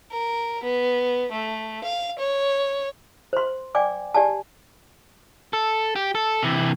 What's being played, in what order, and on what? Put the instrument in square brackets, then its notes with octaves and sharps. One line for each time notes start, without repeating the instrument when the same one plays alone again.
[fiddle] A#4
B3
A3
F5
C#5
[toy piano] C5 C6
D5 G5 G#5 D6
G4 D5 G#5 A5
[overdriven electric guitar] A4
G4
A4
C3 E3